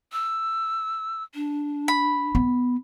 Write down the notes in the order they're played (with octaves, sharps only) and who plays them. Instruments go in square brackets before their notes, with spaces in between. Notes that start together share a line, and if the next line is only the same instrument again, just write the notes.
[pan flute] E6
D4
[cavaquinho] B5
[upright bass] B3